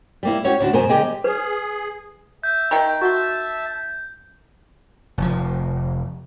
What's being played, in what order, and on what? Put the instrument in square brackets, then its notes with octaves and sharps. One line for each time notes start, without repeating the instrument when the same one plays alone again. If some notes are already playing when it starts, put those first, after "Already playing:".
[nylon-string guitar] G3 A#3 E4
C#4 F#4 G4 C#5
D2 D4 F#4
F#2 B2 A#4 C5 G#5
D3 G3 G4 G#4 D#5 G5
[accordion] G#4 [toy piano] B4
[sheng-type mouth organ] E5 [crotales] G6
[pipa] D#3 G5
[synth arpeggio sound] F#4 C6 [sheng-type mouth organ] E5 A5
[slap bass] F1 F3